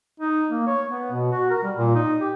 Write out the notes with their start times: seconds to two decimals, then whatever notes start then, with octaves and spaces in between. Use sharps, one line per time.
0.20 D#4
0.50 A#3
0.67 C#5
0.89 B3
1.11 B2
1.32 F#4
1.50 A#4
1.63 G3
1.76 A#2
1.95 D#4
2.21 G4